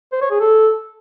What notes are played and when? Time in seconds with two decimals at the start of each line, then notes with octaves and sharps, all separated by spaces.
0.13 C5
0.22 C#5
0.31 G#4
0.40 A4